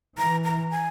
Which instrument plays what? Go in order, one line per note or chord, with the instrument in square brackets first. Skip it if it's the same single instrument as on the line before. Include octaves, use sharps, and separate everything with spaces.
[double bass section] E3 [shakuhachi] A#5
[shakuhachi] A#5
G#5